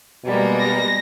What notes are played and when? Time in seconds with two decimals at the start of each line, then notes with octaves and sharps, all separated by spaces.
0.24 B2 G3 G#3 A#3
0.60 A#6